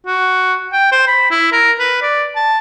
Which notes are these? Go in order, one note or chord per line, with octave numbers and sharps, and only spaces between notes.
F#4
G5
C5
B5
E4
A#4
B4
D5
A5